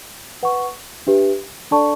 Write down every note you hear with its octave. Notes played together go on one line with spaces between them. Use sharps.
B4 F#5 C#6
D4 G4 B4 E5
D4 A4 D5 A5 C#6